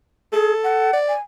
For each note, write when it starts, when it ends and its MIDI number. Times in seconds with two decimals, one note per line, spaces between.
0.33 0.54 68
0.33 0.93 69
0.64 0.96 78
0.94 1.14 74
1.08 1.20 80